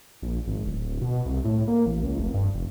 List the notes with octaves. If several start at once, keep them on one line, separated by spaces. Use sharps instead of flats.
A#1
G#1
D1
B2
C2
A2
A#3
A1
C#2
F1
G2
F1